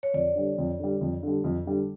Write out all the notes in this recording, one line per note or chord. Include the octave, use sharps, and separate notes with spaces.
C#5
F2 D5
D3 G3
F2
D3 G3
F2
D3 G3
F2
D3 G3